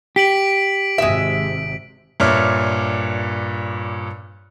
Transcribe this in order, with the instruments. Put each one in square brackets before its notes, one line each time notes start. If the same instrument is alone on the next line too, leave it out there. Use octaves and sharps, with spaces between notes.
[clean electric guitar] G4 [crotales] B6 D7 F#7
[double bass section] G#1 C3 [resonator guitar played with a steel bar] G#3 E5
[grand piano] G2 A#2 C#5 E5 D6 F6